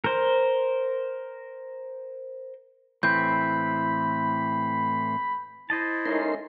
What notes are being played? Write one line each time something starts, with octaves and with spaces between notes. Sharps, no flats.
A#4 C5
A2 E3 C4 B5 G6
E4 C5 D#5 A5
G#3 A3 C#4 D#4 A#4 C6